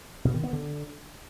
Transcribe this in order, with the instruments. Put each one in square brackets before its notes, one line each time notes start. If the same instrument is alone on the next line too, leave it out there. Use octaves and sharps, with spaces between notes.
[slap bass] B2
D#3
B3
D3